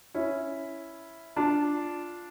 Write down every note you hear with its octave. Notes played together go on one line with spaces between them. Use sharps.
C#4 E4
D4 F4